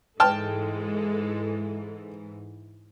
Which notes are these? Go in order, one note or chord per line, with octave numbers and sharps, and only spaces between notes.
G#2 E3 G#3 A4 G5 A5 F6